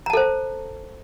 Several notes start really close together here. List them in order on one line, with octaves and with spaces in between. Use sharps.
A#5 A5 A4 C5